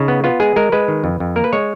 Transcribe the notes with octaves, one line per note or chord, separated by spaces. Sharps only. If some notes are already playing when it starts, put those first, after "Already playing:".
Already playing: C#3 D#4
B3
B3 F4
G#3 G#4
G#3 A#4
G#3 B4
D#3
F2
F2
A#3 A#4
B4
G#3 C#5